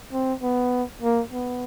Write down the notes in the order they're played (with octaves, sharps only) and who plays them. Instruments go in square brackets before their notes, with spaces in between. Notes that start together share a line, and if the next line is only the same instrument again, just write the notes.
[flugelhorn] C4
B3
A#3
B3